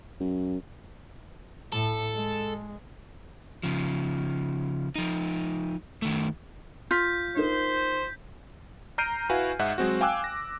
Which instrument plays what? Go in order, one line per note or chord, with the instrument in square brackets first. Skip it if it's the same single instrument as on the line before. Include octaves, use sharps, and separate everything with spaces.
[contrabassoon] F#2
[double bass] A2 [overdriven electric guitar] A4
[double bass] G#3
[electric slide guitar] C#3 F3
F3 D#4
D#3 A3
[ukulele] F4 [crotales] G6 B6
[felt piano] D#4 A#4 [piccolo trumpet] C5
[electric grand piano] A#5 F6 G6 C7 D7 D#7
E4 F#4 B4 F5 G#5
G#2 D#4 E5 F#5 F#6
F#3 G#3 C4 F#4
F5 G5 G#5 D6 E6 F#6
A#6